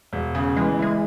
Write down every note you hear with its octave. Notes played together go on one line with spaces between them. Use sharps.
E1
C#3
E3 G#3
G#3 E4